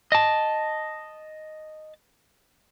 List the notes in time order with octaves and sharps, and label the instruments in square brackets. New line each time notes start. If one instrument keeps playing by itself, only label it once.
[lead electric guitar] D#5 A5